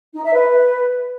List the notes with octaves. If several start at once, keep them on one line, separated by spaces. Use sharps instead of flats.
D#4
E5
B4